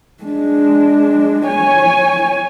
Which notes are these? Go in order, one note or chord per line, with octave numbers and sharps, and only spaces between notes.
G#3 D4
C#5 G#5